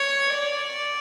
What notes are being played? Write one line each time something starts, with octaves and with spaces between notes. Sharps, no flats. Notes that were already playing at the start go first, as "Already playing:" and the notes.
Already playing: C#5
D5